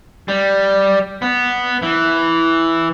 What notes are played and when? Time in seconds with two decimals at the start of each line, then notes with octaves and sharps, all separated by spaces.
0.28 G3
1.22 B3
1.82 E3